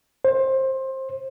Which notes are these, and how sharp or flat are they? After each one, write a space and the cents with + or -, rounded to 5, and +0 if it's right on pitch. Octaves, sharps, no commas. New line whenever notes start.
C5 +20